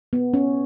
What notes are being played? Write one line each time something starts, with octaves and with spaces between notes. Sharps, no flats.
B3
C#4